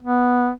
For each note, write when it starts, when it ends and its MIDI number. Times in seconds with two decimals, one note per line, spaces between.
0.03 0.50 59